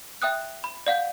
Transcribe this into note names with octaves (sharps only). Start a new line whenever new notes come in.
E5 G5 D#6 F#6
B5
D5 F5 F#5 G6